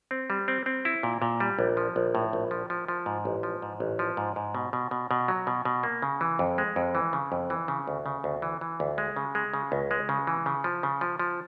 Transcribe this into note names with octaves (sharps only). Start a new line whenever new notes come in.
C4
G3
C4
C4
E4
A#2
A#2
G3
A#1
F3
A#1
A2
A#1
F3
F3
F3
G#2
A1
F3
G#2
A1
F3
G#2
G#2
B2
B2
B2
B2
F#3
B2
B2
A#3
C#3
E3
F2
G#3
F2
E3
C#3
F2
E3
C#3
D2
C#3
D2
E3
E3
D2
G#3
C#3
G#3
C#3
C#2
G#3
C#3
E3
C#3
F3
C#3
F3
F3